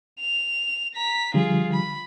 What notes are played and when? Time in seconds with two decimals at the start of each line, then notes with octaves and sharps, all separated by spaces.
0.21 F7
0.94 A#5 B6
1.34 D3 F3 G3 F4 G#4
1.73 B5